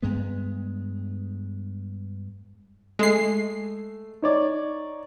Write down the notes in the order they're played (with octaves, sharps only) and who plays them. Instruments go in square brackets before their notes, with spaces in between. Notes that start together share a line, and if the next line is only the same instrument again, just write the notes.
[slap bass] G2 G#3 B3
[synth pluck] G#3 C7 [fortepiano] A3
[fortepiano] D#4 C#5 D5